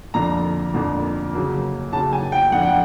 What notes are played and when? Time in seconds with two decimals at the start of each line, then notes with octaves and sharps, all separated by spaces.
0.14 F2 D3 F3 A#3 A#5
0.74 F2 D3 F3 A#3
1.33 C#3 F#3 A#3
1.93 C#3 F#3 A#3 A5
2.13 G#5
2.32 G5
2.52 F2 D3 F3 F#5
2.63 G5